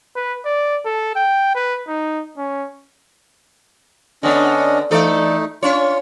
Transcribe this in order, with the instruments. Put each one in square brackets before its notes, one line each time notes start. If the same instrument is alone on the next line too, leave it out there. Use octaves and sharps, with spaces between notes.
[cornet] B4
D5
A4
G5
B4
D#4
C#4
[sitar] D3 B3 [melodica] C#4 D4 D#5
[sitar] E3 A4 D5 [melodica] A3 D#4
[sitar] C#4 C#5 [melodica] F4